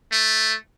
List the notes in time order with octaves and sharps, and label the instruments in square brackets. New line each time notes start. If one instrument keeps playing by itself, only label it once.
[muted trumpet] A3